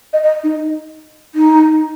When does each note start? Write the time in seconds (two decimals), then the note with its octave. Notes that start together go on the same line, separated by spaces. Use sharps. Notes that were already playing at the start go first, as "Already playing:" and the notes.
0.13 D#5
0.24 D#5
0.44 D#4
1.35 D#4